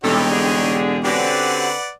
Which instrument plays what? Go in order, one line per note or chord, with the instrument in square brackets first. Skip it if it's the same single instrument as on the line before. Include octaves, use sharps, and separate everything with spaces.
[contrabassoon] E1 [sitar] B2 G3 [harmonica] D#4 G4 C#5 [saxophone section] A4
[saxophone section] D3 G#4
[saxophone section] D3 C4 [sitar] C#4 F#4 G4 [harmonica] B4 D5 F#5